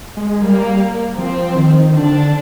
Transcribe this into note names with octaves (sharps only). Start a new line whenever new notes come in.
G#3
G3 A#3
F3 C4
D#3
D3 D4